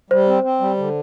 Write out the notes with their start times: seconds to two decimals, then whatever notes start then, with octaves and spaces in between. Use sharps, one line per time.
0.10 G3 C5
0.27 C4
0.43 C4
0.60 G3
0.77 D3